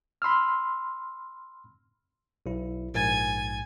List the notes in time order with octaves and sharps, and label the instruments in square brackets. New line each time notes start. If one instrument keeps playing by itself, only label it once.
[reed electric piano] B5 C6 E6 F6
[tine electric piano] B1 E4
[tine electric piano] A#1 G#2 A6 [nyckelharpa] G#5